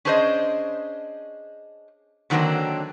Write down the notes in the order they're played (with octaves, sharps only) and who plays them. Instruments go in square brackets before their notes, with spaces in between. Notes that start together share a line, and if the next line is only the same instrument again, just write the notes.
[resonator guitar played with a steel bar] C#4 D4 G#4 C5 C#5 D#5
D3 D#3 F#3 A#3 C4 D4